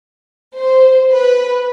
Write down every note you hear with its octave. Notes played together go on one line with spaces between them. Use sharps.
C5
B4